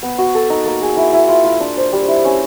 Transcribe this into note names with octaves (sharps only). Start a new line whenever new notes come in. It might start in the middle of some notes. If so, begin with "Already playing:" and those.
B3
F#4
A4
D#4
A#3
G#4
E4
E4
F4
F4
D4
C5
G3
E4
C#4